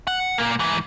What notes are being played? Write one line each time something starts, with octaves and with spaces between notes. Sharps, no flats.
F#5
A#2 A#3
G#2 E3